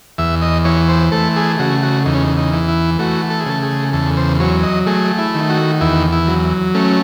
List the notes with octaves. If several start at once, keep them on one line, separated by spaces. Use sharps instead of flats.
E2 E5
D#5
E3 C#5
C5
A3 A4
G#4
C#3 F#4
F#4
E2 D#4
C#4
D#4
D#4
E3
E4
A3 F#4
A4
G#4
C#3 A4
G#4
E2 A4
C5
F#3 C#5
D#5
A3 G#4
E4
D#3
F#4
E2 E4
E4
F#3
A3 C#4